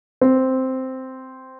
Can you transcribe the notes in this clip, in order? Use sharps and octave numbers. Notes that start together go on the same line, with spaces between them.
C4